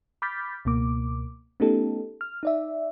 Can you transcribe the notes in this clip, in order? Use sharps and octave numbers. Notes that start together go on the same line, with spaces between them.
B5 D6 F6 G6 A6 B6
C#2 B2 A#3 D6
A3 B3 C#4 D#4 G4 A4
F6
D#4 D5 E5